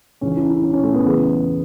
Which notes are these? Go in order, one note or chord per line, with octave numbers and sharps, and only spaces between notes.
C#2 C#3 E3 C#4
E4
E4
C#4
C#4
A3
B3
E2 C#3 E3